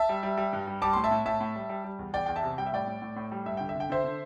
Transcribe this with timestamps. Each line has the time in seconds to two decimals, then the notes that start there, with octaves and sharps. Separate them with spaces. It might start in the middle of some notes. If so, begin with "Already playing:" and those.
Already playing: E5 A5
0.09 G3
0.23 G3
0.38 G3
0.53 G2
0.67 G3
0.82 G3 A5 D6
0.93 A2 C6
1.04 E5 A5
1.11 A2
1.25 A2 E5 A5
1.41 A2
1.56 G3
1.69 G3
1.84 G3
1.99 E2
2.14 E2 D5 G5
2.26 E2 G5
2.36 E5 A5
2.43 C3
2.58 G3 G5
2.66 E5
2.73 A2 D5 G5
2.87 A2
3.02 A2
3.16 A2
3.31 G3
3.46 G2 E5
3.57 D3 G5
3.69 E5
3.75 D3 G5
3.90 D3 C5 E5
4.04 D3